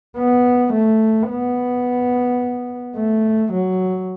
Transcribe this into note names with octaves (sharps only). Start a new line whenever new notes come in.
B3
A3
B3
A3
F#3